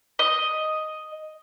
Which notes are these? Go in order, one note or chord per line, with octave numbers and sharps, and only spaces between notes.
D#5